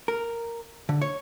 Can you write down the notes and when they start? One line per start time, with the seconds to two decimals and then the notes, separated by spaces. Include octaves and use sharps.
0.08 A#4
0.89 D3
1.02 C#5